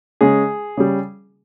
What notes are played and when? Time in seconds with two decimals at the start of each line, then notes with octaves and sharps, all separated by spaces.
0.21 C#3 G#3 G#4
0.77 C#3 G3